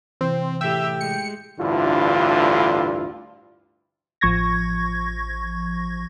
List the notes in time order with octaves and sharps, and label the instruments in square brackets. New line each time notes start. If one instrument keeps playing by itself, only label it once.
[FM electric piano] C3 E3 [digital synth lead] C4
[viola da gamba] A2 G4 [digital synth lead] E5 [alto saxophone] G5
[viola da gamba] G#3 [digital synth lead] C#7
[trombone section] A1 D2 G2 D3 E4 F4
[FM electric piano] A1 F3 C#6 G#6 A#6